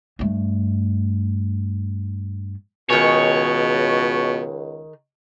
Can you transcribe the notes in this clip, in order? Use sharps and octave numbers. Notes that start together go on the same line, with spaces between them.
G2 A3
C#2 B2 D#3 G#4 C#5